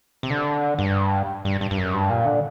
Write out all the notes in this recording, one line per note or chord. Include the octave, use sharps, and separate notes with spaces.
C3
D3
G2
G2
G2
G2
F#2
G2
A#2
D3